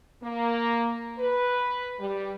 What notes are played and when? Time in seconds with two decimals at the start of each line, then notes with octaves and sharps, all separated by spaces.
0.22 A#3
1.18 B4
1.99 G3